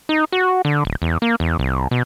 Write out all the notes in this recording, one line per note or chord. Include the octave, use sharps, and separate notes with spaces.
D#4
F#4
D3
D1
E2
A#3
E2
C2
B2